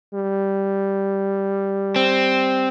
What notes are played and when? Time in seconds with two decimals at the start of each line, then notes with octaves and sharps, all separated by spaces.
0.14 G3
1.96 C4